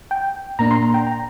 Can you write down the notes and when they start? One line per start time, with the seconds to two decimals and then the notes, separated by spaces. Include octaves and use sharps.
0.11 G5
0.59 A#2 A#3 D4 A#5
0.71 C6
0.83 A#5
0.94 G5
1.07 A#5